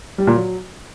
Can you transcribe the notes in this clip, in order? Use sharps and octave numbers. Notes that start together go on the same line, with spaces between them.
G3
A#2
F#3